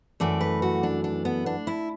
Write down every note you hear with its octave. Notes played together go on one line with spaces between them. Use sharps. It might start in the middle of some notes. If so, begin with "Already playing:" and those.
F#2 E3 A3 D5
B4
F#4
D4
D4
B3
D4
E4